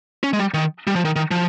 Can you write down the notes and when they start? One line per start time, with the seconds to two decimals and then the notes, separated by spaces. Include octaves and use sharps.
0.23 C#4
0.33 G#3
0.39 G3
0.54 D#3
0.87 G3
0.96 F3
1.05 D#3
1.16 D#3
1.31 F3